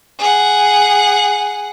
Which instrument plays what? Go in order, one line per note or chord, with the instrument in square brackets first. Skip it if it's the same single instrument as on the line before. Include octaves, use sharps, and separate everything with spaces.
[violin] G#4 F#5